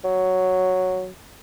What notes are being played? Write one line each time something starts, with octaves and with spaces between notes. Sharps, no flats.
F#3